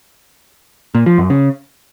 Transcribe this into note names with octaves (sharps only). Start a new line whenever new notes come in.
A#2
F3
F#2
C#3